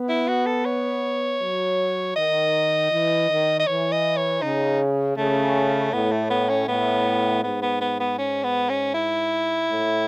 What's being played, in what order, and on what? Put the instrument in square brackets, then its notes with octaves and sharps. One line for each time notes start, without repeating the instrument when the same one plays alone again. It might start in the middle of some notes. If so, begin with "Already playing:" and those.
Already playing: [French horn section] B3
[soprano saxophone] E4
F#4
A4
C#5
[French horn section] F#3
[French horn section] D#3 [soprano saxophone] D#5
[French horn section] E3
D#3
[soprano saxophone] D#5
[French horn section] E3 [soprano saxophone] C#5
[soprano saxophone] D#5
C#5
[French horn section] C#3 [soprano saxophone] D#4
[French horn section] C#3 [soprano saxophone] A3
[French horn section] A2 [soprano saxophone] B3
[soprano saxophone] A3
B3
C#4
[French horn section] A2 [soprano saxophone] B3
[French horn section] G#2 [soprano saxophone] B3
[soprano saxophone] B3
B3
B3
C#4
B3
C#4
E4
[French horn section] A2